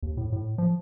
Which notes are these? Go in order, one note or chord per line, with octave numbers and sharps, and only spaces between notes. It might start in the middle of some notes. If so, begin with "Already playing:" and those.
D#2
A2
A2
F3